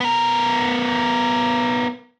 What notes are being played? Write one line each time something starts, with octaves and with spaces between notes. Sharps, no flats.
B3 A#4